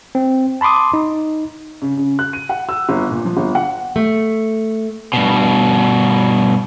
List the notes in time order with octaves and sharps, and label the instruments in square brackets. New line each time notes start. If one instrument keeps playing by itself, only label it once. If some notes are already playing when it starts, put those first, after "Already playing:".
[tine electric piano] C4
A5 B5 C6 D6 D#6
D#4
[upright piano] C#3
C#3
F#6
D#7
F#5
E6
G1
A#2
F3
G1
F#5
[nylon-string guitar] A3
[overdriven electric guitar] G2 B2